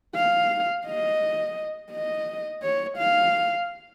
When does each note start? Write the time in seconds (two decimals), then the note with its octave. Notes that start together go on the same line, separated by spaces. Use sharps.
0.15 F5
0.86 D#5
1.92 D#5
2.62 C#5
2.98 F5